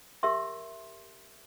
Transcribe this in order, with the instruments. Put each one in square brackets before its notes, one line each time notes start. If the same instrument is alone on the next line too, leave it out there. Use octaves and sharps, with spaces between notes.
[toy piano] G4 A#4 E5 C6